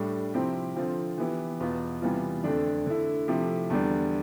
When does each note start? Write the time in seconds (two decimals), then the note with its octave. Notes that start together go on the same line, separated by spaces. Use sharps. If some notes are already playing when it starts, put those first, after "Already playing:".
Already playing: A2 G3 D4
0.34 C3 F3 C4 E4 G4
0.76 D3 F3 C4 F4
1.18 E3 B3 E4 G4
1.60 E2 B2 B3 F4
2.02 C3 E3 G3 B3 F4
2.44 F2 D3 A3 D4
2.86 D3 A3 E4
3.28 C3 F3 A3 E4 G4
3.70 E2 D3 G3 D4